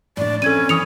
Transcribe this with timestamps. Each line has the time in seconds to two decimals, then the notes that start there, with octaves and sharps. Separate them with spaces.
0.17 A2 D4 D5
0.42 C4 C#4 E4 A4 G#6 D#7
0.69 E3 D#6 C#7 F7